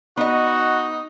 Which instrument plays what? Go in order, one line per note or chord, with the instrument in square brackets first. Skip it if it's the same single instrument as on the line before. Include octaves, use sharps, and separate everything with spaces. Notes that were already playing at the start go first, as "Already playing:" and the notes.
[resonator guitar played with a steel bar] B3 D#5 [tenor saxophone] D#4 [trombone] F#4